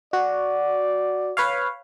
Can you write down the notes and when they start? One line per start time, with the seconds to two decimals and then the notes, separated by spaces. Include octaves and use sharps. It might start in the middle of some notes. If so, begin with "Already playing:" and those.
0.13 F#4 D5
1.37 B4 C#5 F5